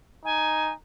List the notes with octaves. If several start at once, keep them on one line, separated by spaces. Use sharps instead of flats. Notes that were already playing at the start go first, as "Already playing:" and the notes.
D#4 G#5